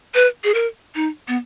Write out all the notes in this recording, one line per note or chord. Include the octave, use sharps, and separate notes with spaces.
B4
G#4
A#4
D#4
B3